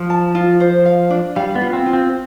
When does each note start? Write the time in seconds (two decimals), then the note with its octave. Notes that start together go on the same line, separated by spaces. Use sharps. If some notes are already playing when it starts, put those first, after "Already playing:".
Already playing: F3
0.10 A5
0.35 F4
0.60 C5
0.85 F5
1.10 D4
1.36 G3 F5
1.55 B3
1.61 F4
1.73 C4
1.86 F4
1.93 C4